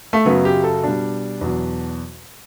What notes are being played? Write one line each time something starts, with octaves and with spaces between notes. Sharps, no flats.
A3
F#2 C#3 F#3 B3
G4
A4
B2 G3 D4
E2 B2 F#3